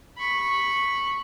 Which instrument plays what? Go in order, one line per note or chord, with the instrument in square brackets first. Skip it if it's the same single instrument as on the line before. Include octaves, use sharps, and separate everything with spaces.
[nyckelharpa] B5 C#6